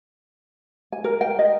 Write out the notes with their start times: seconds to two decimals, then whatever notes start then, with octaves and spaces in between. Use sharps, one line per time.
0.92 G#5
1.04 A#4
1.21 G5
1.39 D#5